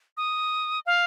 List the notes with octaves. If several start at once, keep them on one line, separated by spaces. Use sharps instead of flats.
D#6
F5